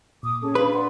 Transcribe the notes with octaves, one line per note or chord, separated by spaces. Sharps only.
A#2 D6 D#6
C#4 G#4 A4
D4 B4 F5
D5 F#5 C6